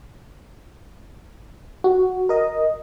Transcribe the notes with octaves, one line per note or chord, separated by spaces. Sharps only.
F#4
A#4 D#5